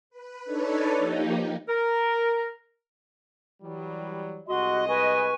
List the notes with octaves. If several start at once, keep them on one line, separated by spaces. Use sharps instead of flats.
B4
D4 D#4 A4 B4 C#5 D5
F3 A#3 D#4 G4
A#4
E3 F#3 G3
C2 G#3 F#4 D#5 C6
B4 G#5 C#6